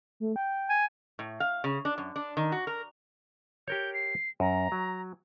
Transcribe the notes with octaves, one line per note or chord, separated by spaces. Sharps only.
A3
G5
G#5
A2
F5
C#3
D4
F#2
D4
D#3
F#4
A#4
G4 A#4 C#5 G6
C7
F#2 A#5
F#3